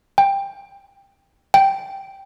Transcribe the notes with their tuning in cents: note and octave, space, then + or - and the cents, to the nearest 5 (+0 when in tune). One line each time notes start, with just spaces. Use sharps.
G5 +15
G5 -5